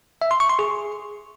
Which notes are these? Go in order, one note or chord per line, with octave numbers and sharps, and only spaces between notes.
E5
C6
C#6
C6
G#4